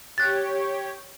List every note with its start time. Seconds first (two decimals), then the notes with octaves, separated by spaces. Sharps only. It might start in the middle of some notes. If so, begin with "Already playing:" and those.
0.18 G4 C#5 F#6 A6